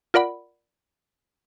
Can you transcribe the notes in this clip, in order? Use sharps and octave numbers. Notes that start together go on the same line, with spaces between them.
F4 A#4 D5 F#5 B5